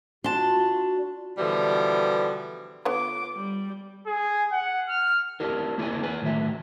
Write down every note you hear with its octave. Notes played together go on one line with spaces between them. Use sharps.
D4 F4 F#4 A5 C6
B2 D3 E3 F3 G3
D3 B3 F4 C#5 D6
G3
G#4
F#5
F6
D4 E4 G4 A#4
A#3 E4 G#4 C#5 G#5
G#4 B4 G#5
A2 D#3 F#3 E5